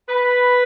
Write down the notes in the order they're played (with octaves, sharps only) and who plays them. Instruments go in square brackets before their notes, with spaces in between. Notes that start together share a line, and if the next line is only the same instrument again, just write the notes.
[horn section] B4